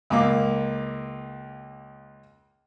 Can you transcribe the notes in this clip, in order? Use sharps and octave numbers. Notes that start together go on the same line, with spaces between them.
C#2 A#3 D6